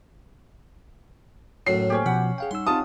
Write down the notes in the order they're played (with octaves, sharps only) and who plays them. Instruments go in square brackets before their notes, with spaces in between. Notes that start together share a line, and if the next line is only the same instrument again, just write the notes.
[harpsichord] F#2 A2 F#3 [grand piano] C7
[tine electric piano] A#3 A4 C5 [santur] C#4 G4
[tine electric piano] B2 F3 [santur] F#5 [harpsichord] B5
[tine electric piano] G#4 F5 G5
[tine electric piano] G3 D#4 E6 [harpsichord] C6
[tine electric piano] C4 D#4 G4 [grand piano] F4 A5 D#6